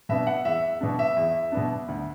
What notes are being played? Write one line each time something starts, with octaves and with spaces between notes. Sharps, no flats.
B2 B3 D4 E5
F#5
E2 E5
B2 B3 D4
E5
E2
B2 B3 D4
D2